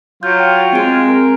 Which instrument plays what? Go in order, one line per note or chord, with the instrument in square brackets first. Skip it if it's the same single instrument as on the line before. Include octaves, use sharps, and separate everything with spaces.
[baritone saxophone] F#3 [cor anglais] F4 [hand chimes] G6
[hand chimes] G5
[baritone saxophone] G#3 [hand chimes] C4 D7
[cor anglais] A#4